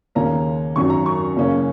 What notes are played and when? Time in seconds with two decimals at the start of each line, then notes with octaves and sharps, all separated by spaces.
0.15 D#2 C#3 A#3 C#4 A#5
0.76 G#1 F#2 F#3 C#6
0.90 A#5
1.06 C#6
1.36 F#1 F#2 C#3 A#3 C#4